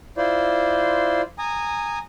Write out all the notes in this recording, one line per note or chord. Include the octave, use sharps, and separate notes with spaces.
E4 F4 C5 D5
G#5 A#5 D#6